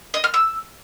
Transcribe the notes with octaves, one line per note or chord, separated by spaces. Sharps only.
D#5
F6
E6